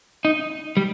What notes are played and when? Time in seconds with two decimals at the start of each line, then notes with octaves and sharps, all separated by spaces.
0.25 D#4
0.77 G3